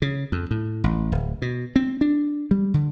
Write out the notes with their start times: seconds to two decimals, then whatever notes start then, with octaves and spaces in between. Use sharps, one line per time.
0.02 C#3
0.32 F2
0.51 A2
0.84 A1
1.12 D1
1.42 B2
1.76 C4
2.01 D4
2.51 G3
2.74 D3